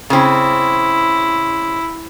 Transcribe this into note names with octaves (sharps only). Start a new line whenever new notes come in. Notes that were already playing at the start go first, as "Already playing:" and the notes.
C#3 C4 E4